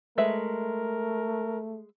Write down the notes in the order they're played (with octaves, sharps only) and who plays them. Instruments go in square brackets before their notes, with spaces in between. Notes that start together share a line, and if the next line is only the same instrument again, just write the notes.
[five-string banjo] G#3 B4 E5 [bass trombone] A3 [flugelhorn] A#4